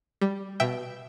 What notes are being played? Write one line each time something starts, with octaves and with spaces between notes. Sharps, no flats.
G3
B2 E5 G5